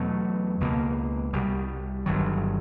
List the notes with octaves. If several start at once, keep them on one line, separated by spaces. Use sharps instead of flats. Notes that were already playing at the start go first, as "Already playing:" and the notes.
Already playing: E2 B2 F#3 A3
C#2 B2 F#3 A#3
C2 B2 G3
G1 G2 D#3 F#3